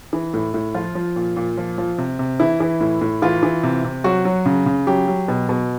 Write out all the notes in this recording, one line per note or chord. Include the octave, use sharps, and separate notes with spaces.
E3
A2
A2
F3 F4
F3
A#2
A#2
F3
F3
C3
C3
E3 E4
E3
A2
A2
E3 F4
E3
C3
C3
F#3 F#4
F#3
C#3
C#3
F#3 G4
F#3
B2
B2